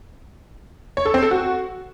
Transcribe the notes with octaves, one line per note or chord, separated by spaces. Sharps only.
C#5
A4
C4
A4
F#4